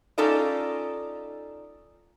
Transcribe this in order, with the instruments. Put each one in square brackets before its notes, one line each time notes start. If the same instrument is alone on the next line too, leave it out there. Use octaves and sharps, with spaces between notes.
[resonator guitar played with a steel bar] C#4 D#4 F4 A4 D5 D#5